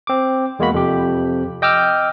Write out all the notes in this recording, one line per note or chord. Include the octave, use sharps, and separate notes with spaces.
C4 D6
E2 G#3 A#3 F#4 B5
F2 C3 G4
D#5 G5 D6 E6 F6